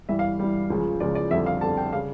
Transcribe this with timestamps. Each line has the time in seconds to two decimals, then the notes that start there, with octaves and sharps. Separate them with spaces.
0.09 G2 E3 G3 E5
0.19 F5
0.39 G2 E3 G3
0.70 C#2 C#3 F3
1.00 C#2 C#3 F3 D5
1.15 D5
1.31 F2 D3 G3 E5
1.46 F5
1.61 F2 D3 G3 A5
1.77 G5
1.93 C#3 G3 F5